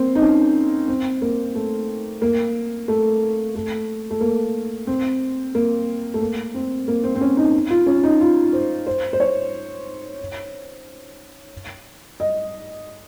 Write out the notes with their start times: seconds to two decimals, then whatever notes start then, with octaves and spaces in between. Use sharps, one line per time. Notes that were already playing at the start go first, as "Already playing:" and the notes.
Already playing: A#3 C4
0.15 D#4
0.22 C#4
0.88 C4
1.22 A#3
1.55 A3
2.22 A#3
2.88 A3
3.55 A3
4.11 A3
4.21 A#3
4.87 C4
5.55 A#3
6.14 A3
6.21 A#3
6.54 C4
6.88 A#3
7.04 C4
7.15 C4
7.21 C#4
7.37 D#4
7.70 F4
7.86 C#4
8.03 D#4
8.21 F4
8.53 C5
8.87 C5
9.13 C5
9.20 C#5
12.20 D#5